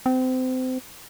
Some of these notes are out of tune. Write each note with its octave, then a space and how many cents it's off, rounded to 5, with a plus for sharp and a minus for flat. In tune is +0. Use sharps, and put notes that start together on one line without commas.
C4 -30